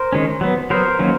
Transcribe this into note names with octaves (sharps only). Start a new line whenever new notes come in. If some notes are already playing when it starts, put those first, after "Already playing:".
Already playing: A#4 C5
D#3 G#3 C#4
F#3 B3
F#3 B3 A#4 C5
D#3 F#3 A#3 C#4